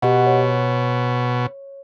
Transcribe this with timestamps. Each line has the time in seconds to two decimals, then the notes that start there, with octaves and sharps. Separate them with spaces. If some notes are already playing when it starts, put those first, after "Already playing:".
0.02 B2 G4 D#5 F#5
0.27 C#5